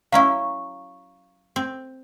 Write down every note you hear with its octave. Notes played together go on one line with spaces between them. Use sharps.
F#3 C#4 E4 F5 A#5 C#6
C4